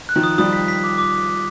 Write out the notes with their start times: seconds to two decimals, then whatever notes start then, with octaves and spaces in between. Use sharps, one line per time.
0.09 F#6
0.16 D#3 F3
0.23 D#6
0.38 F3 G3 D#6
0.53 B6
0.68 B6
0.84 D6
0.98 D6